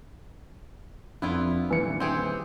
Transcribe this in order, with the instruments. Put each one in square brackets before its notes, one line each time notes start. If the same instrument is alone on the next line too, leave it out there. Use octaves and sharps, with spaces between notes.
[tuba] F2 [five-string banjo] B3 E4 F4 [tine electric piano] D4
[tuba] D#1 [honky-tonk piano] E3 C#7
[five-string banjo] C4 G4 G#4